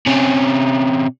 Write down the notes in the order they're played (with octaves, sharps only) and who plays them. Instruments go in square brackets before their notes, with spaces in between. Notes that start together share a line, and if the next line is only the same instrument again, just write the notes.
[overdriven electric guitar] C3 C#4